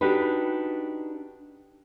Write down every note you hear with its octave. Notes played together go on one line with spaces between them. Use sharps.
D4 D#4 F#4 G4 A4 B4